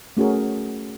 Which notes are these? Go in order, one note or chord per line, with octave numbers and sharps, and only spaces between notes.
A3 C#4 F#4 G#4 A#4